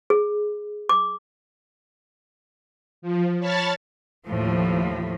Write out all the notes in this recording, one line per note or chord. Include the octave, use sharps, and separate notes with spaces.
G#4
D6
F3
C#5 A5 B5 C#6 F6 A6
D#2 A2 F3